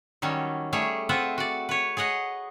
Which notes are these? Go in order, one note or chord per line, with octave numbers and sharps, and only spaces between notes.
D#3 F#3 G3 C#4
G3 A3 G#4 C#5
C4 F4 B4 E5 F#5
F#4 D5
B4 C#5
G#4 C#5 D#5 F#5